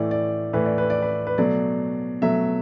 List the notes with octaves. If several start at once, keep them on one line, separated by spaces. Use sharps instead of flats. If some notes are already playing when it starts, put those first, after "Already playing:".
Already playing: A2 E3 A3 D5
D5
A2 E3 A3 B4
D5
B4
D5
B4
B4
B2 F#3 A3 D5
B2 F#3 A3 E5